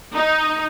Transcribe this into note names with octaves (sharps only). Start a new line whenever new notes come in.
D#4